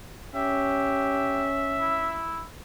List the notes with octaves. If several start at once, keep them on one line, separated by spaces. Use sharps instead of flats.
C#4 G4 E5
E4